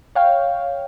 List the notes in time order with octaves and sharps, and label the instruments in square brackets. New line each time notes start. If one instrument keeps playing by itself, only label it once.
[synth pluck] C#5 F5 G5